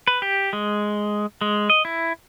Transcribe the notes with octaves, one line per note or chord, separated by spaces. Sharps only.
B4
G4
G#3
G#3
D#5
E4